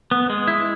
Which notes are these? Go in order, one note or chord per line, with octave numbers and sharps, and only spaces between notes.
B3
G#3
E4